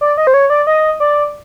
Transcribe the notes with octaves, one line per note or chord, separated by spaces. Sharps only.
D5
D#5
C5
C#5
D5
D#5
D5